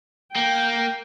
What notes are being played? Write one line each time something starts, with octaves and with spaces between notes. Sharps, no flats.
A#3 G5